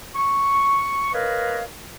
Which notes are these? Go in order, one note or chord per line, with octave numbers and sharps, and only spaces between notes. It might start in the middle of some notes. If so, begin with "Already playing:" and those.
C#6
A#4 B4 C#5 D#5 F5